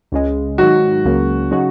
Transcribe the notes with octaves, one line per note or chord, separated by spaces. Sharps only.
C#2 C#3 G#3
G#2 D#3 F#3 D#4 F#4
C#2 C#3 F#3 A#3
C#3 F#3 D#4 F#4